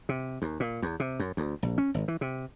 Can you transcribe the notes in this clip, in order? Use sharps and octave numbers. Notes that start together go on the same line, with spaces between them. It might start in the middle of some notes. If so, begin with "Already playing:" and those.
C3
D#2
A#2
E2
C3
F#2
D2
A#1
C#4
G#1
E3
C3